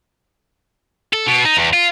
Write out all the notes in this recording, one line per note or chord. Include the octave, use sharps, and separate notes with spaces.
A4
B2
D#4
E2
F4